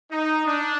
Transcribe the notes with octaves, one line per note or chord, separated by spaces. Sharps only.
D#4
D4